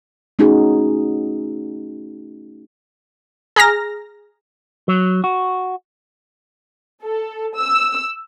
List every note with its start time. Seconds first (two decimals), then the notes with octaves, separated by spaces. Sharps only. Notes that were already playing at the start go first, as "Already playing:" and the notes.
0.39 A3 C#4 D#4 F#4 G#4
3.56 G#4 A#5 F6 A#6
4.88 F#3
5.24 F#4
7.02 A4
7.57 E6